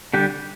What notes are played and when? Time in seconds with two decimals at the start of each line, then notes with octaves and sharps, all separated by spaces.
0.14 D3 G3 D4 G4